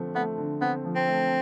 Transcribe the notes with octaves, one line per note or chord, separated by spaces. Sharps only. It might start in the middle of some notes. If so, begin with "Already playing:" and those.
Already playing: D3 F3 A3 C4
A3 B3
D3
B3 C4
F3
C4
A3